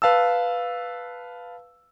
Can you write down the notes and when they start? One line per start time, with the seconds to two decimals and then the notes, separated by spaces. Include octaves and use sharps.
0.02 B4 F5 A5 E6